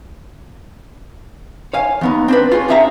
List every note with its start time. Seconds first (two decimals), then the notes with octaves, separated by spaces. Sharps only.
1.73 C#5 F5 G#5
2.01 D#2 B3 D#4
2.28 C4 D4 B4
2.51 F4 G#4 C#5
2.68 C4 D4 G#4 E5 F5 A#5